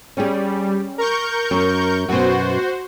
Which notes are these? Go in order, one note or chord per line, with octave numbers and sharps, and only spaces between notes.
G3 C#4 G#4
A#4 C#6 G6
F#2
F#2 B2 F#4 C5